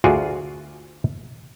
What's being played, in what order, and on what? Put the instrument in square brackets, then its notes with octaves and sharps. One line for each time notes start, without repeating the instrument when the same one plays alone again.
[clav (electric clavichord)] D2 F4 F#4 G#4 D5 G#5